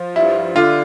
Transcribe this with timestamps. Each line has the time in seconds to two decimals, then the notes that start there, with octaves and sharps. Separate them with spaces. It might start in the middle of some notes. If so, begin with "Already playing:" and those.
Already playing: F3
0.16 G2 E4
0.55 D3 F4